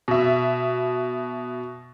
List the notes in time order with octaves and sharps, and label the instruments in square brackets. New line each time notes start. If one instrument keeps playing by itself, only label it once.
[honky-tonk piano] B2 E5